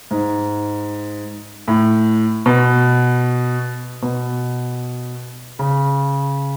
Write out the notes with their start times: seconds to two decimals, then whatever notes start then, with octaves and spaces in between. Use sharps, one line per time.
0.11 G#2
1.68 A2
2.46 B2
4.02 B2
5.59 C#3